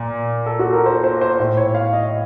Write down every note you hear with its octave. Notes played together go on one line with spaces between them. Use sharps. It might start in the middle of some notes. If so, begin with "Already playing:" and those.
Already playing: A#2
A4
F#4
A#4
C5
C5
C5
A2
C#5
F5
D#5